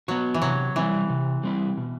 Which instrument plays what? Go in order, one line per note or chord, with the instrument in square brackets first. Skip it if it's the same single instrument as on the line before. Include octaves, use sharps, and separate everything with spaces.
[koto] F#3 [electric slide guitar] B3 F#4
[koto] E3
[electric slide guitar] C3 [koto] F#3
[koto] E3 [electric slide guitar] G3 C4 E4
[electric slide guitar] C3
G3 C4 E4
B2